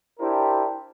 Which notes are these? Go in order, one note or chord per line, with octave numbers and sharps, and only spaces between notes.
D4 E4 G4 A#4 C5